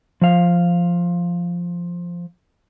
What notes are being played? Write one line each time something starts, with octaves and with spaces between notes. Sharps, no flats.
F3 F5